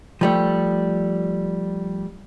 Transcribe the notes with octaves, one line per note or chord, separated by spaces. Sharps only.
F3 G3 A3